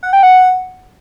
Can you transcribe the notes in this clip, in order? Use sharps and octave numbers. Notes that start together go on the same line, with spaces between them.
F#5
G5
F#5